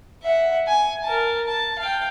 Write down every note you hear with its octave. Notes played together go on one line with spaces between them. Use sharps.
E5 F#5
G#5
A#4 A5
A5
F5 G5